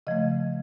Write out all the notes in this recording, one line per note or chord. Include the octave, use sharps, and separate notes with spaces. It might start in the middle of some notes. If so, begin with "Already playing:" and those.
C#3 F3 A3 D#5